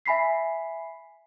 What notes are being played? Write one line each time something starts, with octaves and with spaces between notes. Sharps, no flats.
E5 G#5 B5 B6 C7